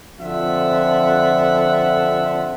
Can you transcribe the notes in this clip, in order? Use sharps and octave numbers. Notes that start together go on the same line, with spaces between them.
F2 D3 C4 F4 E5 F#5